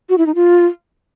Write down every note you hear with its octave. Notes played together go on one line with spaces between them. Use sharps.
F#4
E4
D#4
F4